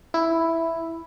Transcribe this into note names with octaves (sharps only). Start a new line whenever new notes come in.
E4